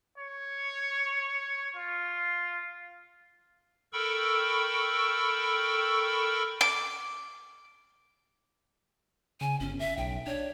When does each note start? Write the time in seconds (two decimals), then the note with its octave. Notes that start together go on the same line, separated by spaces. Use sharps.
0.18 C#5
1.77 F4
3.93 A4 A#4 G5 B5 C#6 E6
6.61 D6
9.41 C#3 G#5
9.60 G1 C#4
9.79 E5
9.97 B1 G5
10.27 D4 C#5